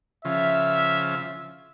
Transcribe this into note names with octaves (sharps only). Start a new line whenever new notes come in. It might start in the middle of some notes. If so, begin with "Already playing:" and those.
C#3 F3 E5